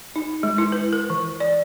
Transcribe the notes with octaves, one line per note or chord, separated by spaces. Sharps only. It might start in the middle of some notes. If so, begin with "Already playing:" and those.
D#4
G#3
E4
B4
A#4
E3
D5